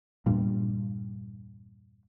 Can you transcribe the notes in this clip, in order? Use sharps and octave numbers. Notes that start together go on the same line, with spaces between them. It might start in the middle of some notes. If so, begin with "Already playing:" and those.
E2 G2 A#2